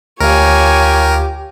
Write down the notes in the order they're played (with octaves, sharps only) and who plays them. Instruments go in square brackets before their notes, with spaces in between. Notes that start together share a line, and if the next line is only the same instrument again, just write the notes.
[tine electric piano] D2 F5 [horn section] F4 G4 [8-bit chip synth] A#4 [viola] C#5 G#5